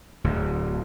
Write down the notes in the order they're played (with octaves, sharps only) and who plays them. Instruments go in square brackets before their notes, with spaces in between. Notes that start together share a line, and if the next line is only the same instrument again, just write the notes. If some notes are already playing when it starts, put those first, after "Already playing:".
[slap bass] D1 D2